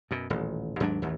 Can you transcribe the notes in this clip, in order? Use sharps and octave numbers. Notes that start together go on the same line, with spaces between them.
F#2 B2
D#1 A1
D#2 G#2 F#3 D4
A1 D#2